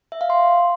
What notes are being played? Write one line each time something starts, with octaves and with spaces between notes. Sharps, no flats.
E5
F5
C6